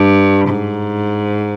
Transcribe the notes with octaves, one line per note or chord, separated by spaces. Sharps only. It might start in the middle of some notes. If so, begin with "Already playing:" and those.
Already playing: G2
G#2